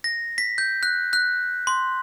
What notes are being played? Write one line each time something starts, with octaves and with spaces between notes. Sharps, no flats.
A#6
B6
G6
F#6
F#6
C6